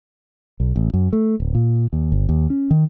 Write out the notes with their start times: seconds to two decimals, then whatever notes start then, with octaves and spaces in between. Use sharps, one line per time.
0.60 B1
0.76 A1
0.94 F#2
1.13 A3
1.40 D1
1.55 A#2
1.93 D#2
2.12 G1
2.29 D#2
2.50 C#4
2.71 D#3